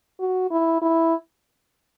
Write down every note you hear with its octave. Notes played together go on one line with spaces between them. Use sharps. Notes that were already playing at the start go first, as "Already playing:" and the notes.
F#4
E4
E4